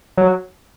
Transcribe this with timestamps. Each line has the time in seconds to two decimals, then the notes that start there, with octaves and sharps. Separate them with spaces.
0.18 F#3